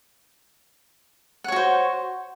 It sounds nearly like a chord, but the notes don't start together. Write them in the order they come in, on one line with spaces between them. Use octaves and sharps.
F#5 C#5 F#4 C5